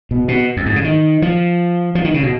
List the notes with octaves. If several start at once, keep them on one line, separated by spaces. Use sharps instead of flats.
B2
B2
F2
G#2
C#3
D#3
F3
F3
D#3
C#3
B2